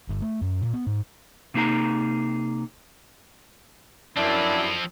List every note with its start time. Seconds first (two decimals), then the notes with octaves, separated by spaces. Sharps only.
0.09 G1
0.22 A3
0.41 F#2
0.62 A#2
0.74 B3
0.86 G#2
1.54 C3 A#3 D#4 G#4 A#5
4.17 F#2 F3 C4 D4 E4